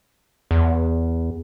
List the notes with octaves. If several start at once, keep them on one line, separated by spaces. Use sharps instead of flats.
E2